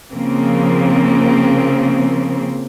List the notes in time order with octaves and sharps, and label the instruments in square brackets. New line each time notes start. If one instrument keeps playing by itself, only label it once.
[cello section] C#3 F3 A#3 C4